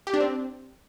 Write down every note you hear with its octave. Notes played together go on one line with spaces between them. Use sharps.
G4
D4
C4